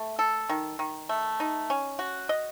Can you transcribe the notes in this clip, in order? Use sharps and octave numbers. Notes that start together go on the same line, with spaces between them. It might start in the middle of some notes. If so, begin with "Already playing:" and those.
Already playing: A3
A4
D#3
D#3
A3
D#4
C#4
F#4
D#5